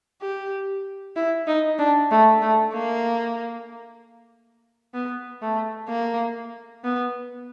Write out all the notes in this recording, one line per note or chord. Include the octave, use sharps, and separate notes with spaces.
G4
E4
D#4
D4
A3
A3
A#3
B3
A3
A#3
B3